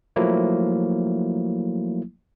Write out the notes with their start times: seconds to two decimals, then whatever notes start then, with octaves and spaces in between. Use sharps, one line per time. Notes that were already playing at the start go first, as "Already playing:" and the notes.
0.16 F3 F#3 A3 A#3 E4